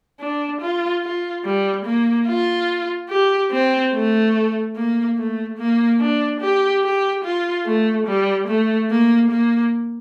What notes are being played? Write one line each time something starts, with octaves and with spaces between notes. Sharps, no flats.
D4
F4
F4
G3
A#3
F4
G4
C4
A3
A#3
A3
A#3
D4
G4
G4
F4
A3
G3
A3
A#3
A#3